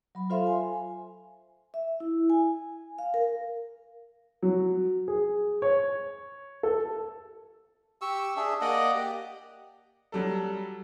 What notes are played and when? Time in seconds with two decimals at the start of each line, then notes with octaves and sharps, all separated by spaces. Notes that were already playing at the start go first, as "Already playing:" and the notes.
0.15 F#3 B5
0.30 F4 A4 C5 E5 F5 C6
0.47 G#5
1.74 E5
2.00 E4
2.30 G#5
2.99 F5
3.14 A#4
4.43 F#3
5.08 G#4
5.62 C#5
6.63 A4
8.02 G4 C#6 E6
8.36 D4 G#4 E5
8.61 A#3 D5 D#5 F#5
8.95 G4
10.12 F#3 G3 A4